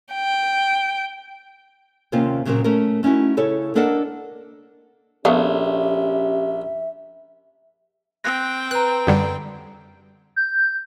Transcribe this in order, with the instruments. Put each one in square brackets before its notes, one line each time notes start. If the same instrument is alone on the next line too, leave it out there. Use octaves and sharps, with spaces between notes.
[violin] G5
[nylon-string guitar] D#2 C3 A#3 C4 C#4 F4
A#2 C#3 F#3 A#3 C4 A#4
A3 C#4 A#4
A3 C#4 D#4 E4 F#4
C#3 E4 A4 C#5
A#3 D4 A4 A#4 D#5 F#5
[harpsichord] A#1 [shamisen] A3 B3 F5 [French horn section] C#4 G4 [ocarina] E5
[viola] C4 G5 [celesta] F#6 A#6
[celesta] B4 A#5 [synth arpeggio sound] F#6
[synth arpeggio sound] F#2 D3 G3
[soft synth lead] G6